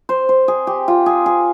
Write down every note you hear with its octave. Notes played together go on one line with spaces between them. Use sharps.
C5
C5
G#4
G4
F4
G#4
G#4